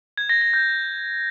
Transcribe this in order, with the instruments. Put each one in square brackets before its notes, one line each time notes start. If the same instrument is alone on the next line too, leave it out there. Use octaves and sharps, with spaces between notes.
[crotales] G#6
A#6
A#6
G6